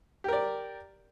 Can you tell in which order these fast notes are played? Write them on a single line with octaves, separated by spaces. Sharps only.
G4 A#4 D5